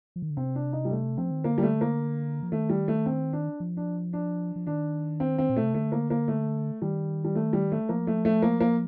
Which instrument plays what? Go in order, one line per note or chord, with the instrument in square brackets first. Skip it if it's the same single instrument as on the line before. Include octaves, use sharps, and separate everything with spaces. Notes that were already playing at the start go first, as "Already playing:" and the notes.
[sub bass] F3
D#3
D3
[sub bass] C3 [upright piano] C4
[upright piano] D4
D#4
G3
A3
[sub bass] F3 [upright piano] C4
[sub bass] D#3
[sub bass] D3 [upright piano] A#3
[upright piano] G3
A3
A#3
[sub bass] F3
[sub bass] D#3 [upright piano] A3
[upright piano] G3
A3
C4
D4
[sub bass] F3
[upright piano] D4
D4
[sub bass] F3
[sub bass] D#3 [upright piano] D4
[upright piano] C4
C4
[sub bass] A#2
[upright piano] A3
[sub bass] C3
[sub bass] D3 [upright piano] A3
[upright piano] A#3
A#3
A3
[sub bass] D#3 [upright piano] G3
[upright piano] G3
A3
G3
A3
[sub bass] F3 [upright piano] A#3
[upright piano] A3
A3
A#3
A#3